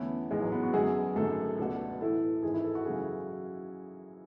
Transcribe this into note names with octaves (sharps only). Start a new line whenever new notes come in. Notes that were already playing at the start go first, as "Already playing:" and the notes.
Already playing: E2 D3 A3 B3 C#4 E4
A1 G#2 E3 G#3
F#3
B3
F#4
F#2 D3 G#3 B3 F#4 G#4
G#1 F#2 D3 F#3 A3 A4
C#2 B2 A3 D4 F#4
A2 E3 A3 E4 A4
G#1 G#2 E3 G#4
E4
A4
F#4
F#2 C#3 E3 G#4